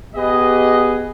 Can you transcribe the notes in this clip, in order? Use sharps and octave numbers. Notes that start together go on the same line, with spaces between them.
B3 G4 G#4 B4 D#5